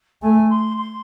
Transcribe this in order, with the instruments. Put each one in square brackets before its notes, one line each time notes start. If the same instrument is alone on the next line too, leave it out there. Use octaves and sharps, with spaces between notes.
[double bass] A3 [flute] G#5
[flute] C6
C6